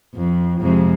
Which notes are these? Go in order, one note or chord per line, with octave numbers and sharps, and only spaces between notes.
F2
F2 C3 G#3